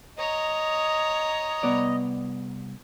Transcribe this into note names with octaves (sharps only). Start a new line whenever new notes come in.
C#5 D#5 A#5
C2 B3 D5